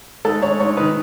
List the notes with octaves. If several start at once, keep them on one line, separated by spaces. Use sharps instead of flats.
G#2 A4
G#2 C#5
G#2 C#5
D#3 B4